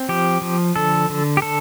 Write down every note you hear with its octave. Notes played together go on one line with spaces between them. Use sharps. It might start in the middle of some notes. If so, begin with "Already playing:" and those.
Already playing: C4
F3 G4
F3
D3 A4
D3
G4
D3 A4